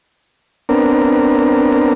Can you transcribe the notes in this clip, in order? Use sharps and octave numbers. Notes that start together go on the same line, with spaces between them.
B3 C4 D4 A#4